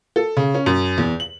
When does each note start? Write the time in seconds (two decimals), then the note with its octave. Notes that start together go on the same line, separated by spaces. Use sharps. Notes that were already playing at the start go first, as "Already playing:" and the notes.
0.16 A4
0.37 C#3
0.54 C#4
0.66 F#2
0.98 E2
1.20 F#7